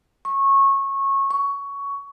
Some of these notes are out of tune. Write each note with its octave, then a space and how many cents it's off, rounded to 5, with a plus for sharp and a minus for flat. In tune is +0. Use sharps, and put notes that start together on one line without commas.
C#6 -20
C#6 +15